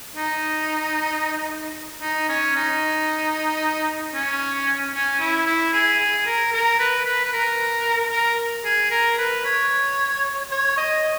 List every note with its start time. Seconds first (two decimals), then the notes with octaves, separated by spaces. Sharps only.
0.16 D#4
2.01 D#4
2.29 C#4
2.56 D#4
4.14 C#4
4.94 C#4
5.20 E4
5.46 E4
5.73 G#4
6.00 G#4
6.26 A#4
6.53 A#4
6.79 B4
7.05 B4
7.25 B4
7.33 A#4
8.12 A#4
8.65 G#4
8.91 A#4
9.18 B4
9.45 C#5
10.51 C#5
10.77 D#5